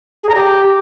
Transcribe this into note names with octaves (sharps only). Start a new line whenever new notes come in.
G#4
A#5
G4